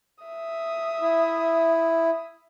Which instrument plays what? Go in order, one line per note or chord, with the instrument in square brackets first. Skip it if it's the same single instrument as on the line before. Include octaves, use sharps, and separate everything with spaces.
[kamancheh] E5 D#6
[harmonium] E4